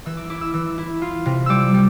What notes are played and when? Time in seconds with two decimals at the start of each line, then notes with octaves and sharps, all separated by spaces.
0.06 E3 E6
0.17 D6
0.30 E4 D6
0.41 E6
0.54 E3 E6
0.78 E4
1.02 F4
1.26 C3
1.46 G3 D6 E6
1.74 G3